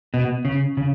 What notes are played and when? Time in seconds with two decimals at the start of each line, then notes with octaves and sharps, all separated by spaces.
0.14 B2
0.45 C#3
0.77 C#3